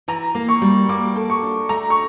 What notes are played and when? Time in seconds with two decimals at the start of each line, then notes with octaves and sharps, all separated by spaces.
0.08 E3 A#5
0.35 A#3
0.49 C#6
0.62 G3
0.89 A#3 D6
1.16 A4
1.30 C#6
1.43 D4
1.69 A3 A#5
1.90 C#6